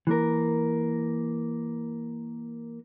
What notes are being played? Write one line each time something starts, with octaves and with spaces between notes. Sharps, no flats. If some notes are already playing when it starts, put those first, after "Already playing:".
E3 A#3 A#4